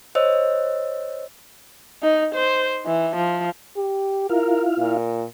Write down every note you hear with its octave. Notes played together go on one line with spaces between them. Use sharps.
C5 C#5 D#5 E6
D#4
C5
E3
F3
G4
E4 F4 A#4 F5
A#2